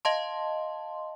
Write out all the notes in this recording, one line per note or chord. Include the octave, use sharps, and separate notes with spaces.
D#5 F5 A5 C6